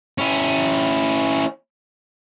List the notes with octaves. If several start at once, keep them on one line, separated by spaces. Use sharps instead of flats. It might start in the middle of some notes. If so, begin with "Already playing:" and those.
C#4 E4